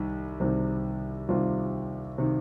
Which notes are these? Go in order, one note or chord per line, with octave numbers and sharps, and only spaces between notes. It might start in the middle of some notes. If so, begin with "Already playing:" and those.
Already playing: C2 C3 D#3 D#4
C2 C3 D#3
C2 C3 D#3 F4
C3 D#3